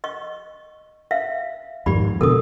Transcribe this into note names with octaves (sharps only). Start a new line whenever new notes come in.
D#5 C#6
E5 F5
F2 G#2 D#3 G4 D5 B5
B2 D3 A4 A#4 D#6